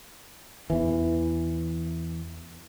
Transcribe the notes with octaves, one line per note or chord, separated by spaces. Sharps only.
E2 E3